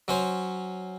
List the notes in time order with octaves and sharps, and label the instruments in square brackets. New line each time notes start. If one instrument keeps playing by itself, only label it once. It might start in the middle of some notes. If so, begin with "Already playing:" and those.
[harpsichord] F#3 C#4 C5